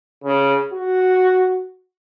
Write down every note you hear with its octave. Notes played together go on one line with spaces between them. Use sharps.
C#3
F#4